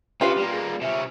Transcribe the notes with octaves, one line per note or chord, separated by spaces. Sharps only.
C#3 F4 G4 B4 F5
G3 A#3
G#4
C3 C#4 E5